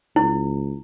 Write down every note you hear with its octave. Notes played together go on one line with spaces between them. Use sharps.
C#2 E4